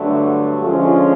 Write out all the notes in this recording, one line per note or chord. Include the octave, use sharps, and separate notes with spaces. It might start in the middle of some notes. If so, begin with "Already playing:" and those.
Already playing: G2 D3 F#3 A3
D3 F3 G#3 C#4 F4